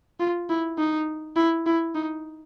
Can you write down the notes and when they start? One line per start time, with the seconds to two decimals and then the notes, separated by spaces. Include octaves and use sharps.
0.20 F4
0.49 E4
0.78 D#4
1.36 E4
1.66 E4
1.95 D#4